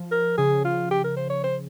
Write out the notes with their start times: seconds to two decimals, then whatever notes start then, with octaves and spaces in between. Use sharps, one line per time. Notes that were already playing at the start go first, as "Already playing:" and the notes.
Already playing: F3
0.11 A#4
0.38 C#3 G#4
0.65 F4
0.91 G4
1.04 A#4
1.17 C5
1.30 C#5
1.44 C5